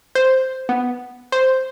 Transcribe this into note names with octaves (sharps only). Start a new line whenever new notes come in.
C5
B3
C5